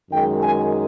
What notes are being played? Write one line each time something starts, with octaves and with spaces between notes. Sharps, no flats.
F#2 D#3 G#3 G5
G#5